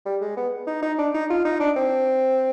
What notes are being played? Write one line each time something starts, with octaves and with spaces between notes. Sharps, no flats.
G3
G#3
B3
D#4
D#4
D4
D#4
F4
D#4
D4
C4